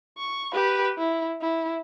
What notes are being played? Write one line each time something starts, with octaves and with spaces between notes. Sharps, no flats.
C#6
G4 B4
E4
E4